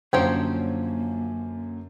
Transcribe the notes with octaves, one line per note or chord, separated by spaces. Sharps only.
F#2 D3 F3 F#3 A#3 C#4 C5 G5